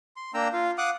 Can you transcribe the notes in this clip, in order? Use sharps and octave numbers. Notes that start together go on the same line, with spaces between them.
C6
A#3 D4 G5 A#5 E6
F4 F5
F5 F#5 D6 D#6 F#6